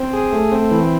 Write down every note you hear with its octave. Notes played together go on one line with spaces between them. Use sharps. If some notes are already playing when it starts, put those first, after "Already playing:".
Already playing: C4
G#4
A3
C4
E3